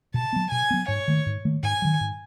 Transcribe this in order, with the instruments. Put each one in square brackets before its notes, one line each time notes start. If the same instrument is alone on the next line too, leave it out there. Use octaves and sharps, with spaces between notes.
[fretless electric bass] B2 [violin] A5
[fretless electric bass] F#3 B3
[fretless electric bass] B2 [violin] G#5
[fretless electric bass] F#3 B3
[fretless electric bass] G#2 [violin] C#5
[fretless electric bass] D#3 A3
G#2
D#3 A3
[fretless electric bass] G#2 [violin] G#5
[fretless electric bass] D#3 F#3
G#2